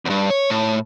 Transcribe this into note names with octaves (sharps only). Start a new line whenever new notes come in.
E2 G2
C#5
A2